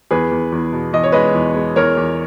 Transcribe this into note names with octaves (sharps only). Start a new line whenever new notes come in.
E2 G#4 B4
E2
E2
B2
E2 D#5
C#5
G#3 B4 D#5
E2
G#3
E2 A#4 C#5
E2